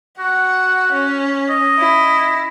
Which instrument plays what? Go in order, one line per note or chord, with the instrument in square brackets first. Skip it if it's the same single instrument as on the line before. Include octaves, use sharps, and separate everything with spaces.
[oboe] F#4 [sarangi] F#5
[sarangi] C#4
[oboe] D#5
[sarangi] E4